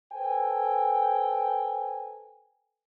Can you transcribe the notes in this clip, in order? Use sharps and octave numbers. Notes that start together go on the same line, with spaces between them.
A4 B4 C5 G5 G#5